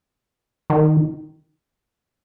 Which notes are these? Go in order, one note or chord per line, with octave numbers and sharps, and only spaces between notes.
D#3